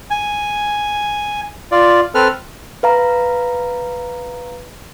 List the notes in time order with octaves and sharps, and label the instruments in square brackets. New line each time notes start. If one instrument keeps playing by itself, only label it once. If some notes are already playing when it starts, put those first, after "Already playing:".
[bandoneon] G#5
F4 D5
C4 A4 B4 F6
[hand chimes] B4 F5 A#5